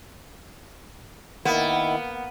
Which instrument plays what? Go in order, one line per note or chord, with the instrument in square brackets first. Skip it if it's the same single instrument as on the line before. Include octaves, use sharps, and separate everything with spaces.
[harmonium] D#3 E4 [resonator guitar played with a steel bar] A#3 [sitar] B3